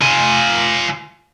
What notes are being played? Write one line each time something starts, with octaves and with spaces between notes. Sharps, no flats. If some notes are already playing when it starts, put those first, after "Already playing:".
F4 G#5